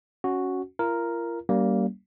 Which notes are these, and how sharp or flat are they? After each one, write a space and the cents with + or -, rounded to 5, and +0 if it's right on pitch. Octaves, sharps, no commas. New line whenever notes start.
C#4 +0 F#4 +0
F4 -40 A#4 +0
G3 -30 A#3 +0 C#4 +40